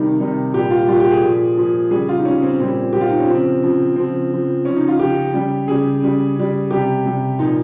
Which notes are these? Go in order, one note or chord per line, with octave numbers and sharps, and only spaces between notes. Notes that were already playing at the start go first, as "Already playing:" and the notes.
Already playing: C3 D#3 G3 D#4
C3 D#3 G3
A#2 G3 G4
F4
A#2 G3 F4
G4
G#4
A#2 F3
A#2 F3
C#3 G3 G#4
F4
D#4
C#3 G3 C#4
C4
A#2 G3 C4
A#2 G3 G4
F4
D#4
C#4
C#3 F3 C4
C#3 F3
C#3 F3 C4
C#3 F3
C#3 F3 C#4
D#4
F4
C#3 F3 G4
C#3 G3
C#3 G3 G#4
C#3 G3
C#3 G3
C3 G3 G4
C3 G3
A#2 F3 D#4